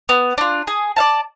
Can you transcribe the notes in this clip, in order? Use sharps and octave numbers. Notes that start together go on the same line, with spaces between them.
B3
D4 F4
G#4
D5 F5 A5